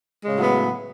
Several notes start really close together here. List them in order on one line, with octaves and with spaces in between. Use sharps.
G#3 C#3 A2 F#3 B3